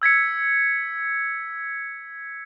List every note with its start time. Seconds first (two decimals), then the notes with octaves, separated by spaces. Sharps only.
0.02 E6 G#6 B6 C#7